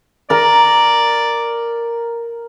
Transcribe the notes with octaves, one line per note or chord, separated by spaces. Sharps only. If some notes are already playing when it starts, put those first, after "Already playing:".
A#4 D5 A#5